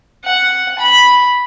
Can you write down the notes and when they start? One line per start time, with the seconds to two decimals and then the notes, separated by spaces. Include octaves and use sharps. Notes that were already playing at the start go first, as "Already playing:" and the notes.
0.24 F#5
0.79 B5